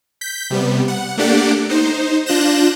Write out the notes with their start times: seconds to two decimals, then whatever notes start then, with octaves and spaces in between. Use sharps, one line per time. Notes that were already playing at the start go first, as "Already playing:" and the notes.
0.21 G6 B6
0.50 C3 G3 B3
0.88 F#5
1.18 A3 A#3 D4 G4 D5 F#5
1.70 D#4 C5
2.26 D4 F4 F#6 G6 A#6 E7